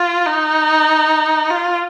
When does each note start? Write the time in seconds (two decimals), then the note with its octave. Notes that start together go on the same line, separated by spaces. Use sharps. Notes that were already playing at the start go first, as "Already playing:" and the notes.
Already playing: F4
0.26 D#4
1.51 F4